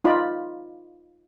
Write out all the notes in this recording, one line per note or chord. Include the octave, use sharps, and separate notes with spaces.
D#4 F4 D5 B5